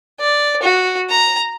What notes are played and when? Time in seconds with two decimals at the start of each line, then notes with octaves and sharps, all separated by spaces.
0.20 D5
0.62 F#4
1.09 A#5